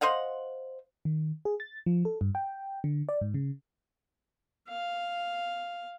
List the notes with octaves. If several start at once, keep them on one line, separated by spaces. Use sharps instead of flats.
C5 D#5 F5 F#5
D#3
G#4
A6
F3
A4
G2
G5
D3
D5
G#2
C#3
F5